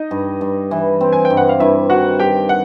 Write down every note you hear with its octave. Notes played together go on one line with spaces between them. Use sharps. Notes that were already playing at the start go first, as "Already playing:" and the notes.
Already playing: D#4 D#5
G2
G2
E3
C4
G#5
G5
G2
F#5
F5
G2 E4 E5
D#3 F#4 F#5
G2 G4 G5
F#5